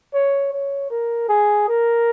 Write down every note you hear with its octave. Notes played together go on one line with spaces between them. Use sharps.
C#5
C#5
A#4
G#4
A#4